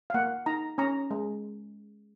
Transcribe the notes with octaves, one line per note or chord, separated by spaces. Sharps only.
F5
A#3 F#5
D#4 A#5
C#4 A#5
G#3